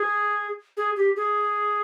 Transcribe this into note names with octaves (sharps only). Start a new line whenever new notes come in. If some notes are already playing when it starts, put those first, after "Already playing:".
Already playing: G#4
G#4
G4
G#4